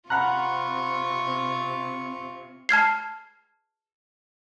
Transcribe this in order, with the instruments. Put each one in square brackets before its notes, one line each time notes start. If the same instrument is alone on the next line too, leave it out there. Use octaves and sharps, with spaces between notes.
[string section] C3 [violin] F4 C#6 [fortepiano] F#5 A#5 [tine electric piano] B5 F6 F#6
[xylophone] A5 F6 G#6 C7